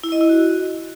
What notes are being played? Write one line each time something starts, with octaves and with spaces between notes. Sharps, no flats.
E4
D#5
E4
F#4